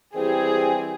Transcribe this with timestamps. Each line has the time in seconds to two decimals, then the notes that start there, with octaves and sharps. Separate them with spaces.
0.16 E3 G3 C4 E4 G4 G#4